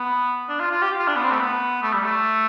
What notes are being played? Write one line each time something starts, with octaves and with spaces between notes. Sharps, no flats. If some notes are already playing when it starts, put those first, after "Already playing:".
Already playing: B3
D4
F4
F4
G4
F4
D4
B3
C4
A3
B3
A3
G3
A3